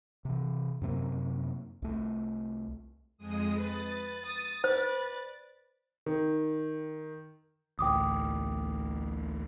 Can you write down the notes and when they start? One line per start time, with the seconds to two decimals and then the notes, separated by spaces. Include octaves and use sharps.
0.25 C3 E3
0.81 F#2 C3 A#3
1.82 C2 A3
3.18 F2 G#3 D#6
3.57 B4 A6
4.25 D#6
4.64 B4 C5 D5
6.06 D#3
7.79 A1 D2 A2 G5 D6 D#6